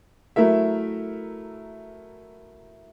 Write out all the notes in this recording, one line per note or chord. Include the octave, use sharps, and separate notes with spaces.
F#3 A3 E4 A#4 E5